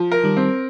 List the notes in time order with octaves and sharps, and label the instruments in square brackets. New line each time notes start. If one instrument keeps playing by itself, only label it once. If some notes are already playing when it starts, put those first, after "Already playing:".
Already playing: [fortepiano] F3
A#4
[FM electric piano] D#3 G3
[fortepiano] C4